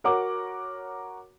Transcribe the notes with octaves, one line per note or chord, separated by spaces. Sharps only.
F#4 A#4 C#5 F#5 A#5 D6